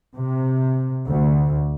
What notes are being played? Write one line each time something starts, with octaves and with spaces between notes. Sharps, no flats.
C3
D2